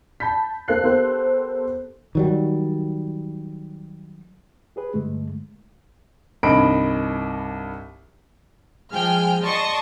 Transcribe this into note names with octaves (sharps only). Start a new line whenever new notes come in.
A5 B5 G6 B6
A#3 A4 C5 F5 F#6 C7
B3 G4 A4 A#4 C5
D#3 F#3 G3
G4 G#4 B4
G2 D3 G#3 A3
C2 G2 D#3 D#5 B5 D7
F3 G#3 G5 G#5 F6
D5 D#5 A5 C6 C#6 D#6